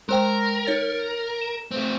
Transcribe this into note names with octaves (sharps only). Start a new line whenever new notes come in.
G#3 A#4 C5 G5
D#4 C#5 A6
E7
A3 C4